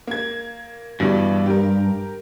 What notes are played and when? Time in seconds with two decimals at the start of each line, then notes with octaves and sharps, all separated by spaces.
0.07 A#3 G#6
1.00 G2 B2 E3 G3
1.46 G4 A#4